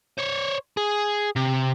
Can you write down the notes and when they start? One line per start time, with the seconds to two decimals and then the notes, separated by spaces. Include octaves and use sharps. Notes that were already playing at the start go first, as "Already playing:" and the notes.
0.18 C5 C#5
0.77 G#4
1.36 C3